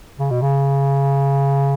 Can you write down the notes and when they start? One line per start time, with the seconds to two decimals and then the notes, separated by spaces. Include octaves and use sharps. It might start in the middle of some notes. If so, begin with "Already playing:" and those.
0.19 C#3
0.31 B2
0.42 C#3